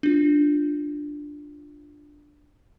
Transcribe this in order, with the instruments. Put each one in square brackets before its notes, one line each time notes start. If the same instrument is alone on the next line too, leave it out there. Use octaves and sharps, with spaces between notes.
[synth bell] D4 F4